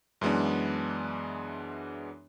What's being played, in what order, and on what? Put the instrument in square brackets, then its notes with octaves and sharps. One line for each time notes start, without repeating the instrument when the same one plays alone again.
[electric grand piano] F#2 E3 G#3 B3 D4